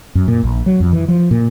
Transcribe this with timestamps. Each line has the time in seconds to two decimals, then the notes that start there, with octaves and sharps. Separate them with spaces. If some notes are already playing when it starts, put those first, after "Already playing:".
0.15 F#2
0.28 A#2
0.44 A#1
0.66 F#3
0.80 F2
0.93 E3
1.08 F3
1.31 A#2